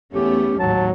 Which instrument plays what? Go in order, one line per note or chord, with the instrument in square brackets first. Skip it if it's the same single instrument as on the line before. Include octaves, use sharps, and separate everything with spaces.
[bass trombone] E2 [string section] A3 B3 C#4 [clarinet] G4
[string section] A1 D#2 G#2 [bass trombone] F#3 [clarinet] A5